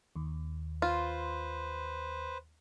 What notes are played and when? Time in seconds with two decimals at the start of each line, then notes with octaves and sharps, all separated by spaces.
0.16 D#2
0.82 F4 B4 C5